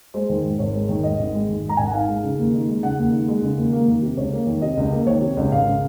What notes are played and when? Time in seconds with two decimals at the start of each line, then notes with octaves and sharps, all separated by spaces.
0.14 G#3 C5
0.29 D#3
0.44 G#2
0.59 G#1 C#5
0.74 G#3
0.89 D#3
1.04 G#2 D#5
1.19 G#1
1.34 G#3
1.49 D#3
1.64 G#2
1.69 A#5
1.77 G#1 G#5
1.86 F#5
1.93 D#4 F5
2.09 G#3
2.24 C#3
2.39 D#2
2.53 D#4
2.68 G#3
2.83 C#3 F#5
2.98 D#2
3.12 D#4
3.28 G#3
3.42 C#3
3.58 D#2
3.72 A#3
3.88 D#3
4.02 C3
4.17 C#2 C#5
4.33 A#3
4.47 D#3
4.62 C3 D#5
4.77 C#2
4.92 A#3
5.07 D#3 C#5
5.21 C3
5.37 C#2
5.52 G#1 F5
5.66 C#3